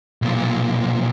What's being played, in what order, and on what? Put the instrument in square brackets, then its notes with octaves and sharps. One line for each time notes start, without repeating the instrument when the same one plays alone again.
[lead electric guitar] B1 A#2